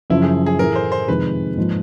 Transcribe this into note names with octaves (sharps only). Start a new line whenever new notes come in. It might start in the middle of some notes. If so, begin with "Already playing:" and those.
F#2 C#3 F3 E4
G#4
G#4
A2 E3 A3 A#4
C5
C5
F2 C3 D#3 G#3 C4 B4
G#2 F3 A#3